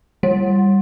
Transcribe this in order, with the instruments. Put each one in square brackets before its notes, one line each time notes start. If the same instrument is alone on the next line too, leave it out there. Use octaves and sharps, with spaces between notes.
[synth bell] G3